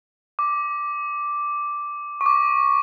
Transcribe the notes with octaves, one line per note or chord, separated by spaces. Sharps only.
D6
C#6
D6